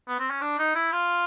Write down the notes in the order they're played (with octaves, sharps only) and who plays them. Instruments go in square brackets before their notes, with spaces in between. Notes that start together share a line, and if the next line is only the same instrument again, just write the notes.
[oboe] B3
C4
C#4
D4
D#4
E4
F4